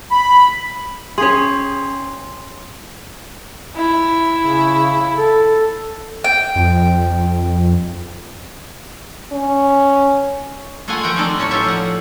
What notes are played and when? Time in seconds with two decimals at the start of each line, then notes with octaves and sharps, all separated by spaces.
0.11 B5
1.18 C#4 G#4 C#5 C6
3.76 E4
4.40 C#3
5.17 A4
6.24 G5
6.56 F2
9.32 C#4
10.88 G#3 A3 F4 F5 F#5 G#5
11.03 F3 A3 A#4 F#5 G5
11.16 G#3 A3 C4 D#4 A4 D5
11.37 A2 F#3 C#4 C#5 A5
11.51 F4 G4 A4 C#5 E5
11.64 F3 F#5